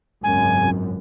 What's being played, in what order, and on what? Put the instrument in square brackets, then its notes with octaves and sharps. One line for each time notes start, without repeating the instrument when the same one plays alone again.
[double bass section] G#1 C#2 F#2 [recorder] G#5